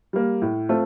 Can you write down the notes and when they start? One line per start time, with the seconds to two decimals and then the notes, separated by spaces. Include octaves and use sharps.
0.13 G3 A#3
0.42 A2
0.69 A3 C4 F4